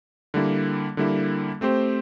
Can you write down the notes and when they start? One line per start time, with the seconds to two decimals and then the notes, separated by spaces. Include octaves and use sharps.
0.34 D3 G3 A#3 E4
0.97 D3 G3 A#3 E4
1.61 A3 C4 G4 C5